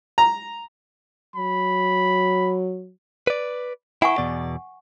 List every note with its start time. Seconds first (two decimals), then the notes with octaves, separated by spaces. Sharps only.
0.18 A#5
1.36 F#3 B5
3.27 B4 D5
4.02 E4 F#5 G#5 C#6
4.18 E2 B2 D5